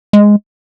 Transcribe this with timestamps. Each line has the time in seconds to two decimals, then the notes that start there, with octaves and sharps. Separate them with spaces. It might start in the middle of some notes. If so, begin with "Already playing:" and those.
0.13 G#3